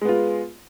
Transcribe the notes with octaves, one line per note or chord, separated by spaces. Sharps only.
G#3 B3 F4